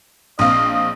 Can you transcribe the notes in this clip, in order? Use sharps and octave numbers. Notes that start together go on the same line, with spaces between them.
A#1 C4 D#5 F5
D#5